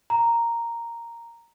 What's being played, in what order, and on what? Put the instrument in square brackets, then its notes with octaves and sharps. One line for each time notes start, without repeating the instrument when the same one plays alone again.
[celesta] A#5